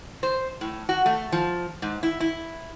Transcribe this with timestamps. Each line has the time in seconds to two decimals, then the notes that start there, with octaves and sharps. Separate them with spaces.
0.23 C5
0.61 A2
0.89 F#4
1.06 A3
1.32 F3
1.82 G#2
2.03 E4
2.20 E4